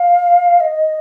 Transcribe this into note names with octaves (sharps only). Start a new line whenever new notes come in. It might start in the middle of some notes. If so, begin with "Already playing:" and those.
Already playing: F5
D#5